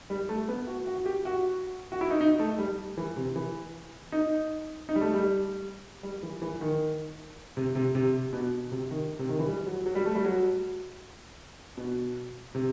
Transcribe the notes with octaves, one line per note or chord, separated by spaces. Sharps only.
G3
A3
B3
F#4
F#4
G4
F#4
F#4
E4
D#4
D#4
A3
G3
E3
C3
E3
D#4
D#4
G3
A3
G3
G3
E3
E3
D#3
C3
C3
C3
B2
C3
D#3
C3
D#3
E3
G3
F#3
F#3
G3
A3
G3
F#3
B2
C3